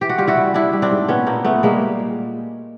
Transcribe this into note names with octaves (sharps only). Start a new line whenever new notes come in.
E3 G4
F#4
G3 F4 G4
E4 F#4
G3
G3 D4 E4
G3
C4 D4
G#2
A#2 B3 C#4
A#2 A#3 C4
A#2 A3 B3
G3 G#3 A#3
G3
A#2